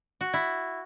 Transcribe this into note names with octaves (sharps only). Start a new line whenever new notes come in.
F#4
E4